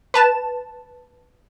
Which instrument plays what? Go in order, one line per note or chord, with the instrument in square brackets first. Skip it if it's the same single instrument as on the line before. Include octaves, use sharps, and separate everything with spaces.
[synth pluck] B4 A5 E7